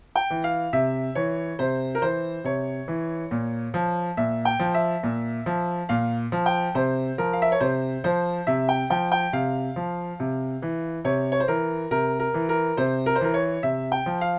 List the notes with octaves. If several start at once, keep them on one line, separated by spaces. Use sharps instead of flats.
G5
E3
F5
C3 E5
E3 C#5
C3 C5
A#4
E3 C5
C3 C#5
E3
A#2
F3
A#2 E5
G5
F3
E5
A#2
F3
A#2 F5
F3
G5
C3 C5
F3 A#4
F5
E5
C#5
C3 C5
F3 C5
C3 E5
G5
F3 G5
G5
C3 F5
F3
C3
E3
C3 C#5
C#5
C5
E3 A#4
C3 A#4
A#4
E3
A#4
C3 C5
A#4
C5
E3 A#4
C#5
C3 E5
G5
F3
F5